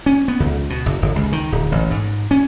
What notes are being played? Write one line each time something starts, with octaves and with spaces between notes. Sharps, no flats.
C#4
B3
C#2
B2
F#1
G1
C#2
D#3
D1
A1
G#2
C#4